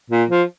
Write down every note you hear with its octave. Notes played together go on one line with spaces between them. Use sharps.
A#2
F3